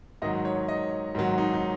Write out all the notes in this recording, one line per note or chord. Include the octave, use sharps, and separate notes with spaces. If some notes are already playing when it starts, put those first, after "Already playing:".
G#2 D#3 F#3 D#5
C#5
D#5
G#2 D#3 F#3
D#4
D#4